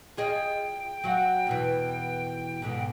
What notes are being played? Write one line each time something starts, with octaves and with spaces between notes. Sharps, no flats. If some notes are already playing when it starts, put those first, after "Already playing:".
F4 G#4 D#5 G5
F#3 F#4 F5
E2 B2 E3
G#2 B2 D3